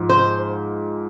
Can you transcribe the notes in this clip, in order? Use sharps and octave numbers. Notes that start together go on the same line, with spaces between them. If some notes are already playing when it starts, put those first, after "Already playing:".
Already playing: G#2 F3 G#3
C5